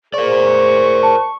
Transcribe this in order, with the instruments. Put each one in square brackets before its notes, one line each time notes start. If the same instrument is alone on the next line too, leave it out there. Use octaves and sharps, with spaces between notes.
[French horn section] G#4 C5 [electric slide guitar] A#4 D5 [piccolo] C#6
[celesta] A5